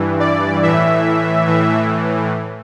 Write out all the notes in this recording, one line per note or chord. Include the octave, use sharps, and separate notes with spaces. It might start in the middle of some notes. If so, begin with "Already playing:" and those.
Already playing: G2 E3
D5
A2 E3 E5
A2 E3